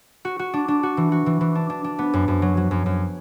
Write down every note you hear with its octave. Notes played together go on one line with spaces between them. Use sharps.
F#4
F#4
D4
D4
F#4
E3
F#4
E3
E3
D4
D4
D4
B3
F#2
F#2
F#3
F#3
F#2
F#2